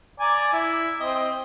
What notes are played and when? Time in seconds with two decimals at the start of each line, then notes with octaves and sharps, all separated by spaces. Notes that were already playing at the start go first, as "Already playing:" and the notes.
0.20 D5 G#5 A#5
0.53 E4
1.00 C4 D#5 G5